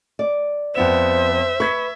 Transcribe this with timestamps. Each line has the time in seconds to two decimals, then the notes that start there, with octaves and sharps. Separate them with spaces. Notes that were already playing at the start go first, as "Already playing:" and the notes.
0.19 D5
0.75 F2 B3 C5 E5 E7
1.60 B4 C#6 G#6 B6